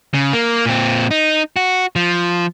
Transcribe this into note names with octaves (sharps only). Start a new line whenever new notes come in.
C#3
A#3
A#2 C4
D#4
F#4
F3